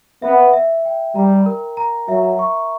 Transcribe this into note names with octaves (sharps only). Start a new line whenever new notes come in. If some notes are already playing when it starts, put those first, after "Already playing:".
B3 E5
E5
G5
G3 A#5
A#4
A#5
F#3 E5
C#6